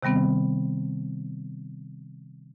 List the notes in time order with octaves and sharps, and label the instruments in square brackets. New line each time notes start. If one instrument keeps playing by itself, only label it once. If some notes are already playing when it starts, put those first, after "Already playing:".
[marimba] C3 D#3 G3 B3 C4